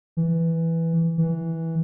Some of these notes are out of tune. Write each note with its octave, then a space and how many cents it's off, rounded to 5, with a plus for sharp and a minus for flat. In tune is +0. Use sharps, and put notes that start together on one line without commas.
E3 +0
E3 -10